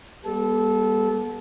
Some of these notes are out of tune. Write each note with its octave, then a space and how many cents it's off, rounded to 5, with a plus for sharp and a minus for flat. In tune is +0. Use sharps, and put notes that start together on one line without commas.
G3 +20 B3 -40 A4 -20